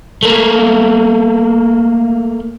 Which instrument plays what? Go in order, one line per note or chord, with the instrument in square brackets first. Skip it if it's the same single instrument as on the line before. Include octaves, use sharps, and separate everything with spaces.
[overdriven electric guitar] A3 A#3